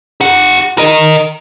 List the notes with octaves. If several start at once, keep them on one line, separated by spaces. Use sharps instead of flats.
G4 F#5
A#4 D#5